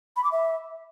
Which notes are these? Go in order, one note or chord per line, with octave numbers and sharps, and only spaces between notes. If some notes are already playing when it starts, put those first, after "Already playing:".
B5
D6
E5